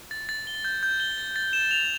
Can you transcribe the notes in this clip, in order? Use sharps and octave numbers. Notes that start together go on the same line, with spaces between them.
A6
A6
G7
G6
G6
G7
A6
A6
E7
F7